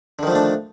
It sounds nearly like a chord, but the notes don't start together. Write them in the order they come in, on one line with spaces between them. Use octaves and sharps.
D3 D#3 F3 A3 D4